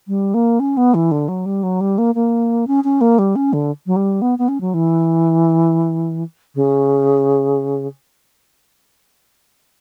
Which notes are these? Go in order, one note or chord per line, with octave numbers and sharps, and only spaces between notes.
G3
A#3
C#4
B3
E3
D3
F#3
G3
F#3
G3
A#3
A#3
C#4
C#4
A#3
G3
C#4
D3
F#3
G3
B3
B3
C#4
F#3
E3
C#3